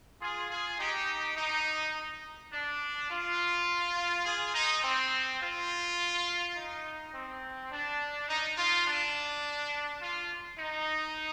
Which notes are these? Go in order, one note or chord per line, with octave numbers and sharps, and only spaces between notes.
F4 G#4
F4 G#4
D#4 G4
D#4
D4
F4
F4 G#4
D#4
C4
F4
D#4
C4
D4
D#4
F4
D4
F4
D#4